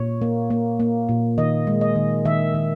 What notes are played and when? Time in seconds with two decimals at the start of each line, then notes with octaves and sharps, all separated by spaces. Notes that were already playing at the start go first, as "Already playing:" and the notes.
Already playing: A#2 C#5
0.22 A#3
0.50 A#3
0.80 A#3
1.09 A#2
1.38 D#3 D#5
1.67 G#3
1.81 D#5
1.95 D#3
2.25 D#3 E5
2.54 D#3